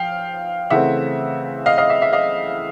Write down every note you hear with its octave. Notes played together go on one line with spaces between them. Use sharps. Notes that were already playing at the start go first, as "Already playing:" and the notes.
Already playing: F3 F5 G5
C#3 E3 A3 C4 E5 F#5
D#5 F5
D#5 F5
E5
E5
D#5 F5